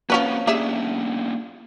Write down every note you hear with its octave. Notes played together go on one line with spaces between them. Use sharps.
F3 A#3 C4 C#4 B4 F#5
A#3 C#4 D4 G4 G#4 E5